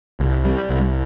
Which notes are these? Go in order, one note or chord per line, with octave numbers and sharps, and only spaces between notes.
C2
G3
C2